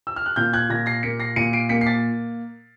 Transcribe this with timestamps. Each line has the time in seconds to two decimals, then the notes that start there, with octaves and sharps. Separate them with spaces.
0.07 E6
0.16 F6
0.26 F#6
0.36 A#2 F6 G6
0.53 F#6 G#6
0.70 A#2 G#6 A#6
0.86 A#6 C7
1.03 A#3 B6 C#7
1.20 A#6 C7
1.36 A#2 C#7 D#7
1.53 C7 D7
1.69 A#3 B6 C#7
1.81 C7
1.86 A6 B6